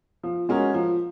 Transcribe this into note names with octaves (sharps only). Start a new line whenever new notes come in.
F3
G#3 C#4 F#4 A#4
F3